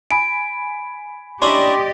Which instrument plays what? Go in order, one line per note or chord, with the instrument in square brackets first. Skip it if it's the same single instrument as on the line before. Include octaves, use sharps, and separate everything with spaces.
[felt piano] G#5 B5 [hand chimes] D7
[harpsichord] C#4 D4 E4 [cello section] G4 D5 D#5 [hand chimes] C6